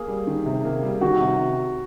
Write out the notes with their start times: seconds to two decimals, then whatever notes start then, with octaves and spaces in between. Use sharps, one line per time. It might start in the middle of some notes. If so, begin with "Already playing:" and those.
Already playing: A#3 G#4
0.08 G3
0.27 D#3
0.46 C3
0.65 A#3
0.83 G3
1.01 D#3 F#4
1.21 C3